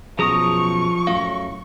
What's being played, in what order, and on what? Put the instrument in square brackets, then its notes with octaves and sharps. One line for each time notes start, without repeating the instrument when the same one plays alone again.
[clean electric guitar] F#2 B2 [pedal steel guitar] F3 A#5 D#6 [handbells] G#4 [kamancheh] C#6
[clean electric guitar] F#2 A2 F#3 [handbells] F5